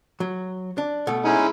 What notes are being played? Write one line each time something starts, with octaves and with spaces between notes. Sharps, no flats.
F#3
D4
B2 A3 A4
G#3 C#4 D#4 E4 G#5